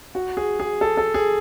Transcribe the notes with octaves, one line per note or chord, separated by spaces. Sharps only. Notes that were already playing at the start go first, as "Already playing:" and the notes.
F#4
G#4
G#4
A4
A4
G#4